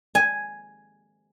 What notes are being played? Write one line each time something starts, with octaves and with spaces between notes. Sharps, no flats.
G#5